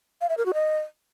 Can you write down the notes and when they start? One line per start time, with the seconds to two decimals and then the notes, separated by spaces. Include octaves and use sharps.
0.21 F5
0.29 E5
0.38 A#4
0.46 F#4
0.54 D#5